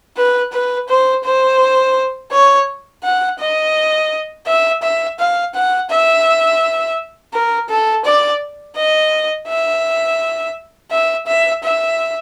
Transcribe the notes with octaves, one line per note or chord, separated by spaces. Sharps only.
B4
B4
C5
C5
C#5
F#5
D#5
E5
E5
F5
F#5
E5
A#4
A4
D5
D#5
E5
E5
E5
E5